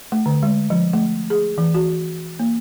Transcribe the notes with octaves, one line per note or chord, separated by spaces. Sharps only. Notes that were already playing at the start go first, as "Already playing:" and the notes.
A3
D3
G#3
F3
A3
G#4
E3
F#4
A#3